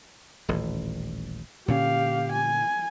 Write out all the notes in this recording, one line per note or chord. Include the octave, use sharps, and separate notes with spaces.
D#1 A1
A#2 D3 C#4 G4 F5
G#5